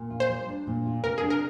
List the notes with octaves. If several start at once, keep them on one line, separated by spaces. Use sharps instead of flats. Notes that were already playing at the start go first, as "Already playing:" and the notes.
Already playing: A#2
F4
C5
G3
D4
A#2
F4
C3 A#4
D4 G#4
A#4